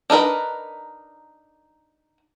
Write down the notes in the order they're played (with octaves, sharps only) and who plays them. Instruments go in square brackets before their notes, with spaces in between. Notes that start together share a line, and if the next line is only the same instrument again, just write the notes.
[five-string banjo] D4 D#4 A#4 B4